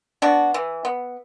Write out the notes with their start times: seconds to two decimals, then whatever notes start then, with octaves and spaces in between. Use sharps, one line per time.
0.22 B3 D4 F#4
0.54 E3
0.85 B3